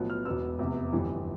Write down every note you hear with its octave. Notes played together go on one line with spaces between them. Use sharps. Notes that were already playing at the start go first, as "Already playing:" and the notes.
Already playing: B1 A2 F3 B3
F6
E1 E2 B2 B3 E6
F1 E2 C3
G1 F2 E3 G3